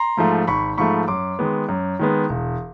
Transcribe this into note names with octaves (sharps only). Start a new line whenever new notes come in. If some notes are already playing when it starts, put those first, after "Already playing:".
Already playing: A#5 C6
G#2 F3 A3
G#1 B5 C#6
G#2 F3 A3 B5 C#6
F#2 C6 D6
D#3 G#3 B3
F#2
D#3 G#3 B3
E1